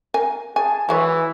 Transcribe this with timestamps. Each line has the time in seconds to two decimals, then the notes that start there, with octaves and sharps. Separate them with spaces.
0.14 A#4 G#5
0.56 G#4 G#5 A5
0.89 E3 F#3 G#3 C#5